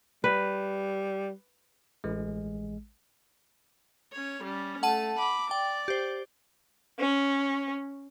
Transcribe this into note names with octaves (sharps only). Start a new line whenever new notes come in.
G3 B4
A1 G#3
C#4 C#5
G3 C#4
A3 F#5 A5 D#7
B5 D6
D5 G5
G4 C5
C#4